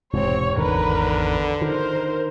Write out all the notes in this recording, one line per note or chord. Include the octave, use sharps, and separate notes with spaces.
E1 G#2 C3 C4 C#5
G#1 E2 D3 D#3 A#4 B4
D#3 A#4 C5